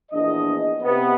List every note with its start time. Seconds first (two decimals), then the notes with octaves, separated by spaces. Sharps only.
0.12 A#1 E2 D4 D#5
0.83 C3 B3